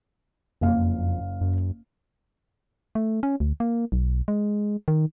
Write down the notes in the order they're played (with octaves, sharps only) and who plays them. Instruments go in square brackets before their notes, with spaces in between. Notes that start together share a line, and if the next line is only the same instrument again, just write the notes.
[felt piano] F#1 F5 [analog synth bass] F2
[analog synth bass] F#2
[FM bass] A3
C#4
D2
A#3
B1
G#3
D#3